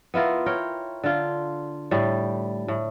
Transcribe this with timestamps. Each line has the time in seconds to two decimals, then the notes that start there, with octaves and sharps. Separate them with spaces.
0.14 B3 E4 F4 A#4
0.46 A#4 C#5 G5
1.04 D3 F4
1.91 A2 G3
2.68 A2